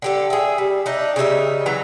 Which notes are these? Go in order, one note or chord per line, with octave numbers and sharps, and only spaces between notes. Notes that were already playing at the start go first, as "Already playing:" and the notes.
D3 G4 A4
G#4 E5
G3
D4 D#4 E5
C#3 G3 D#4 E5
E3 F#3 A#5